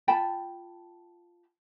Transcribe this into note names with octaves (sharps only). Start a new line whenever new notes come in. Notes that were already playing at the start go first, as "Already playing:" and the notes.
F4 G5 A5 B5